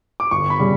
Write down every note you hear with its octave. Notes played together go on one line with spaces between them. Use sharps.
D6
G1 C#6
B5
C#3 G3